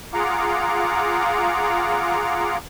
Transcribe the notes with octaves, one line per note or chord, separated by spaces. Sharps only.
F4 G#4 F5 F#5 A#5 D6